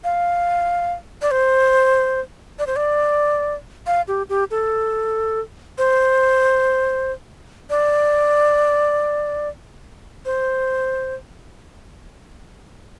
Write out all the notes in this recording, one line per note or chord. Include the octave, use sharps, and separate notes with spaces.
F5
D5
C5
D5
C5
D5
F5
G4
G4
A4
C5
D5
C5